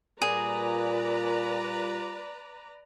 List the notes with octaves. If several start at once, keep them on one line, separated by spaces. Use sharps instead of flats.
A#2 G3 F4 G#4 B4 D5 A#5